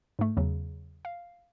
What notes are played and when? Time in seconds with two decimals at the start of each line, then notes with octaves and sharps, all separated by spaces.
0.19 G#2 A3
0.37 E2 C#3 F#3
1.05 F5